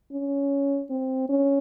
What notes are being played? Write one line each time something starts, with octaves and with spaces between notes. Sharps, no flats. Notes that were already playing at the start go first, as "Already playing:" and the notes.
C#4
C4
C#4